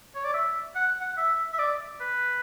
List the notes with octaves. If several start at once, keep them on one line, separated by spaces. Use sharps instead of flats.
C#5
D5
E5
F#5
F#5
E5
E5
D5
B4